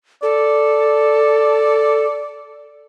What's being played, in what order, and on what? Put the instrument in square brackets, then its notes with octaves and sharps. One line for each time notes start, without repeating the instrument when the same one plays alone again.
[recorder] A4 [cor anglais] D5